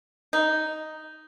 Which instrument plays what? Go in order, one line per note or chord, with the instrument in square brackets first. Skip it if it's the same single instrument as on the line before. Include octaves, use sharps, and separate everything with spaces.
[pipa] D#4